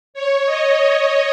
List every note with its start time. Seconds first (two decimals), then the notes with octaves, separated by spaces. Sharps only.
0.14 C#5
0.46 D#5